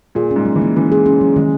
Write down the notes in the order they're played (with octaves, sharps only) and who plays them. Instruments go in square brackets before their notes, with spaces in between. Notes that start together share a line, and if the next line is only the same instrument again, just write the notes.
[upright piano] A#2 [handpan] G#4
[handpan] C#4
[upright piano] G#2
[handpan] F#3
[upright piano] E3
[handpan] A#3
[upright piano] E3 [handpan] C#4
[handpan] G#4
C#4
F#3
[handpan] D#3 [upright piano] G#3